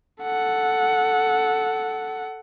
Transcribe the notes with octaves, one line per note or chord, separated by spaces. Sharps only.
A4 F#5